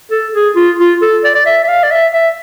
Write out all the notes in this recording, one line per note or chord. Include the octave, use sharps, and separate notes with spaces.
A4
G#4
F4
F4
A4
D5
D5
E5
E5
F5
D5
E5
E5